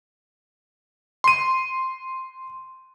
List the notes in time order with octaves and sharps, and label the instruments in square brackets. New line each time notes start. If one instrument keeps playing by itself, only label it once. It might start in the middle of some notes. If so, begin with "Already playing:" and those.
[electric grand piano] C6 D#7